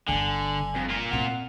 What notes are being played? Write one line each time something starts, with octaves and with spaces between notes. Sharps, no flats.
G1 G2 D3 G#5
F2
A#3 F4
A#2 C4 F#5